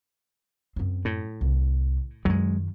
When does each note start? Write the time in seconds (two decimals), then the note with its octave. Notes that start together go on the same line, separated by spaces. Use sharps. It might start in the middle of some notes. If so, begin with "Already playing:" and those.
0.76 F#2 C4
1.05 A2
1.41 C2
2.25 F#2 D#3 F#3 G#3